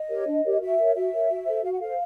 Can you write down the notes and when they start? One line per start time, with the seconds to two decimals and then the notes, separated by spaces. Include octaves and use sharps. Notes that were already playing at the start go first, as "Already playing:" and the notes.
Already playing: D#5
0.09 G4 A#4 C#5
0.27 D4
0.44 G4 A#4 C#5
0.60 F#4 E5
0.78 A#4 C#5
0.95 F#4 E5
1.12 A#4 C#5
1.29 F#4
1.46 A4 C5
1.63 F#4 F5
1.72 F#5
1.80 A4 C5 F5